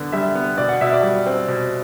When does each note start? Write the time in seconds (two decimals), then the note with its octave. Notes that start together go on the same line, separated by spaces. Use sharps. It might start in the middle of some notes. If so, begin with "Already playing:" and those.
Already playing: D3 B3 D4 D5
0.12 G3 E5
0.35 B3
0.57 B2 D5
0.69 F#5
0.81 B2 E5
0.92 D5
1.03 G3
1.26 C4
1.48 B2